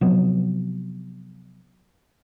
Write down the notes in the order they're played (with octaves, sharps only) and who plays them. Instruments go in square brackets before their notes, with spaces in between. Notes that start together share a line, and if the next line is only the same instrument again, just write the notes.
[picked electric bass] C3 F3 F#3 B3